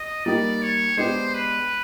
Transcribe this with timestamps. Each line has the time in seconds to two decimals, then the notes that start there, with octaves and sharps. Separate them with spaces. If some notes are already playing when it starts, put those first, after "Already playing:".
Already playing: D#5
0.25 G3 A#3 D#4 G4 D5
0.62 C#5
0.97 G#3 B3 D4 G4 C5
1.34 B4